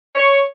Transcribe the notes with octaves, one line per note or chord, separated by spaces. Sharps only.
C#5